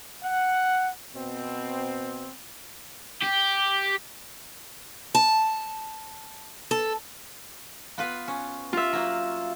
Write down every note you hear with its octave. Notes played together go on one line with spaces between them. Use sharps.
F#5
B2 C4
G4
A5
A4
B3 F4 B4
C#4
F4 E5
F#3 A#3